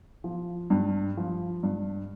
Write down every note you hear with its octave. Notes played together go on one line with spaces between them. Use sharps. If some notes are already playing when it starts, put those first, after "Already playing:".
F3
G2
F3
G2